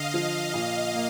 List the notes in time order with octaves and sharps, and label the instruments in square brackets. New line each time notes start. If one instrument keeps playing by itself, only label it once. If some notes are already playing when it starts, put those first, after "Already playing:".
Already playing: [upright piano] D3 [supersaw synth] D#5 F5
[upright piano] F3
A#2
A#3